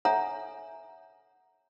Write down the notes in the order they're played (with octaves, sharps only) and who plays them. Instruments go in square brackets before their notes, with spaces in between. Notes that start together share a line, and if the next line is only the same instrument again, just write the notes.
[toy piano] A4 C#5 E5 F#5 G#5 A#5